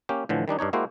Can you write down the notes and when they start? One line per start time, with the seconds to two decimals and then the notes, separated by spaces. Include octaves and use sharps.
0.09 A#3 C#4 G4
0.29 A2 D3 E3 F3
0.48 D#3 G3 D4 D#4
0.59 G2 D4 D#4 C#5
0.73 G#3 A#3 E4 F#4 G4 C5